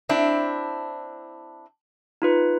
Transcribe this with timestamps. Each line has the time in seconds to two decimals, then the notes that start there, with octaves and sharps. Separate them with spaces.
0.09 C4 D4 E4
2.22 D#4 F4 B4